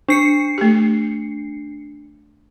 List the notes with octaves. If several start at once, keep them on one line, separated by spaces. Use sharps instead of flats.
D4 C7 C#7
A3 G4